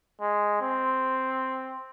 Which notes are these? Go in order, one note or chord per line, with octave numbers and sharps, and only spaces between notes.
G#3
C4